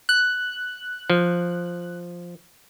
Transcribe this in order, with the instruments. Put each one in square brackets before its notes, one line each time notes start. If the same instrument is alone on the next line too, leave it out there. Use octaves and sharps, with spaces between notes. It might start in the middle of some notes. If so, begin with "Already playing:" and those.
[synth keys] F#6
[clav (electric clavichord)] F3